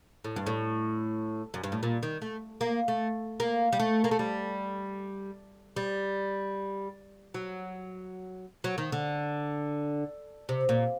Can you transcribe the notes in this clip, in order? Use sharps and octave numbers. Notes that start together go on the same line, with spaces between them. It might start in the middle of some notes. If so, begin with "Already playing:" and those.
A2
G2
A2
F#2
G2
A2
A#2
D#3
A3
A#3
A3
A#3
G3
A3
A#3
A3
G3
G3
F#3
F#3
D#3
D3
C3
A#2